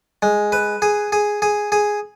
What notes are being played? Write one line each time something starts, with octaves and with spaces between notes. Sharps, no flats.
G#3
B4
G#4
G#4
G#4
G#4